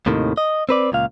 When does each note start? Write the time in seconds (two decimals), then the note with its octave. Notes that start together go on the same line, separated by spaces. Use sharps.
0.06 D#2 A2 C3 D#3
0.37 D#5
0.69 C4 B4 D5
0.92 C#2 A#2 F5